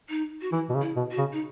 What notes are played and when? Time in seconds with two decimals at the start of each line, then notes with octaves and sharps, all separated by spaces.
0.09 D#4
0.41 F#4
0.52 E3 E4
0.69 B2
0.75 C#3
0.82 E4
0.96 B2
1.11 F#4
1.18 C#3
1.32 D#4